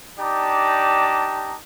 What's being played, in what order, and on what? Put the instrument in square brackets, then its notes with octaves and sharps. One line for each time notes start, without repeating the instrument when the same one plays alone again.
[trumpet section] D4 D#4 G4 D5 A5 A#5